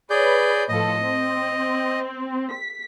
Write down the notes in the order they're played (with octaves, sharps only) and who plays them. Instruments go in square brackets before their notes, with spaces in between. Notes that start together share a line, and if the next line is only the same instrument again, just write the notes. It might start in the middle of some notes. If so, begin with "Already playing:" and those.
[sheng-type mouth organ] G#4 D5 G6 [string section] B4 C#5
[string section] A2 F3 A4 [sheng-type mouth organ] D#5
[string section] C4
B6